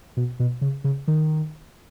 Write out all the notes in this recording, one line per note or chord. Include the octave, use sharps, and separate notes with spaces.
B2
B2
C#3
C#3
D#3